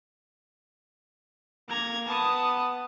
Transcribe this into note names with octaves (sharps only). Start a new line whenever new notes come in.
A#3 A#5 G#6
B3 A5 D#6